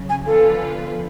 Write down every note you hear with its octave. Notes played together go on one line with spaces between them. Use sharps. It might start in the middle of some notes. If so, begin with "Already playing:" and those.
Already playing: C#3 F#3
G#5
D3 F3 B3 F4 A4 B4